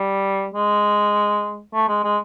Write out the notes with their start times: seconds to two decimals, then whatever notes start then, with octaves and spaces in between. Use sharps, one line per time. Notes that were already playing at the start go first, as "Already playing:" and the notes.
Already playing: G3
0.54 G#3
1.73 A3
1.88 G#3
2.04 G#3